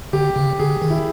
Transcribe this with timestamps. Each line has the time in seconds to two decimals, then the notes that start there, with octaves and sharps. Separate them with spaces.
0.13 D3 G4
0.36 C#3
0.59 D3 G#4
0.82 D#3
0.90 E4